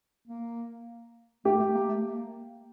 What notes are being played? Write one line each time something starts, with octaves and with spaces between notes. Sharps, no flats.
A#3
A3 G4
A3
A#3
A3
A#3